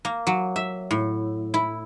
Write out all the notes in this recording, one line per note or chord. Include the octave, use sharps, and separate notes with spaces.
A#3
F#3
E5
A2
E4